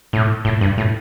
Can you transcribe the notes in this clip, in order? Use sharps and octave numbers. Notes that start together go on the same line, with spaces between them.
A2
A2
G2
A2